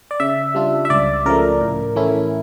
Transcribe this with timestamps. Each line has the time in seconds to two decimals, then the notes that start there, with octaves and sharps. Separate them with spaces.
0.11 D5
0.20 C#3 E5
0.54 G3 D4 F4
0.85 E5
0.90 C#2 D5
1.25 C#3 F3 A3 A#4
1.61 A2
1.96 E3 A3 C#4 E4